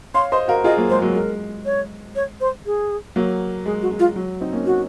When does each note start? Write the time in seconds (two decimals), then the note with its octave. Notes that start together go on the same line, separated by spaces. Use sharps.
0.14 C#5 F5 C6
0.32 C5 D#5 C6
0.48 F#4 A#4 F5
0.64 F4 G#4 D#5
0.77 F#3 A#3
0.90 G#3 C5
1.02 F#3 A#3
1.14 G#3 A#4
1.65 C#5
2.15 C#5
2.41 C5
2.66 G#4
3.16 F#3 A#3
3.66 G#3 G#4
3.82 F#4
3.91 G#3
3.99 F4
4.16 F#3
4.41 C4 D#4
4.53 A#3 C#4
4.66 F#4